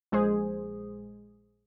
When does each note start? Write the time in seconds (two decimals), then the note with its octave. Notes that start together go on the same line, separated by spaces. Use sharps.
0.12 A#1 G#3 G#4 C5